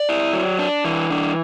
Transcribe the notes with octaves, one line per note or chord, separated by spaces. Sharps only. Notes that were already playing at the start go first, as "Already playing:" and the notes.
Already playing: D5
E4
F#3
D4
E3
D4